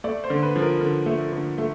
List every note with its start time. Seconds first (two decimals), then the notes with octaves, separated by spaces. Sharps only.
0.04 A3 D5
0.24 C5
0.30 D3
0.43 B4
0.56 F3
0.62 A#4
0.81 D3
1.06 A3
1.32 D3
1.58 A3